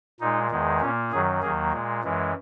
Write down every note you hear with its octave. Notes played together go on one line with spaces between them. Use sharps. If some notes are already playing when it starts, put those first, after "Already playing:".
A#2 G#3 D#4
E2 D#3 G#3
A#2 A#3 C#4
F#2 D#3 F#3 G#4
D#2 D#3 F#3 A#3 G#4
A#2 G#3
F#2 E3 G#3